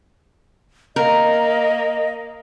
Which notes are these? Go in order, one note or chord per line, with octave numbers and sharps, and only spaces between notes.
A#3 A#4 D#5